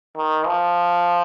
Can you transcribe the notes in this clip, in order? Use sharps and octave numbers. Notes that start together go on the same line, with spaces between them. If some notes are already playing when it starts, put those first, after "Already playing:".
D#3
F3